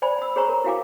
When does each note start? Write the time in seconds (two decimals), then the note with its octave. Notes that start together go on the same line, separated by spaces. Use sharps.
0.02 C5 D5 G#5 B5
0.18 B5 E6
0.36 G#4 C5 C#5 G#5 A#5 C#6
0.49 A#4
0.64 E4 F#4 F5 G#5 D6